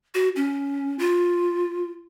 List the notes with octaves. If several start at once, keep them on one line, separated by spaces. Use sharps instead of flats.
F#4
C#4
F4